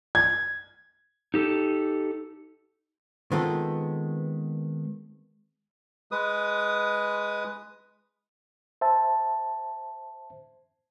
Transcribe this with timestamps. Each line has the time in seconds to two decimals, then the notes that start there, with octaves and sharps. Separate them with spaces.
0.15 G#6
1.34 D#4 G4 A4
3.31 D#3 G#3 B3 C4 F4 A4
6.12 G#3 B4 D#6
8.81 C5 E5 A5